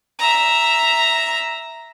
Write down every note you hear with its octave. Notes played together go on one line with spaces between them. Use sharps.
E5 A#5